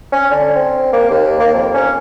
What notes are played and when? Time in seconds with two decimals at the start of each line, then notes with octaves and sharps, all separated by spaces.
0.12 C#4
0.31 D3
0.55 C4
0.93 A#3
1.10 D#2
1.40 A#3
1.54 F2
1.74 C#4